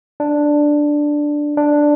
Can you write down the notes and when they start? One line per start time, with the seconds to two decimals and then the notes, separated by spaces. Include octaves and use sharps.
0.20 D4
1.57 D4